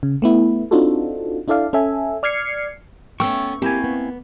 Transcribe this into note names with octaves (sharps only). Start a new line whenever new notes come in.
C#3
A3 B3 E4
C4 D4 D#4 F4 F#4 A4
D4 E4 A4 D5 F5
C#4 A4 E5 G#5
D5 F6 G#6 C7 C#7
A3 B3 C#4 G5 C#6 E6
A#3 C4 E4 G4 G#5
B3